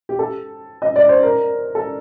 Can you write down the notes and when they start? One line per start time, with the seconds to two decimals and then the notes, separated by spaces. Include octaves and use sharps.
0.09 G4
0.19 A4
0.82 D#5
0.96 D5
1.09 C5
1.23 A#4
1.75 A4